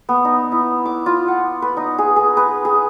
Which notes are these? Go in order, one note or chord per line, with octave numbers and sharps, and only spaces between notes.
B3
D#4
E4
D6
F4
F#5
B4
D#4
G#4
G#4
B4
G#4